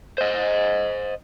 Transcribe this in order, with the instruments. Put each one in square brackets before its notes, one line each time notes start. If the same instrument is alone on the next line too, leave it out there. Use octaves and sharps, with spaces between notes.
[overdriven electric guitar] C5 D#5